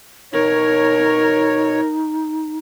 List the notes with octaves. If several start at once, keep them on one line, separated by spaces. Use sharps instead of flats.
B2 D#4 A#4 C#5